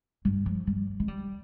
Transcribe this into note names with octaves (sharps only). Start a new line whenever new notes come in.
G2
F3
G3
G#3
G3